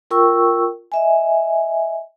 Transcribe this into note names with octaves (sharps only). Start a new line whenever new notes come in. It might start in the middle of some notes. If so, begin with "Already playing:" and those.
F4 A#4 G5 C#6 E6
D#5 E5 G#5